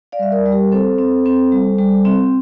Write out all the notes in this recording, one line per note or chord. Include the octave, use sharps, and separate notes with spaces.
D5 F5
G3 E5
A#4 D5
G3
G4 A#4
C4 A4 C5
C4
C4
G3
G3
C4